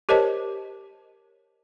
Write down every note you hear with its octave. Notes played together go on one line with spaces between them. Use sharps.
G4 A#4 C5 C#5 D#5 A5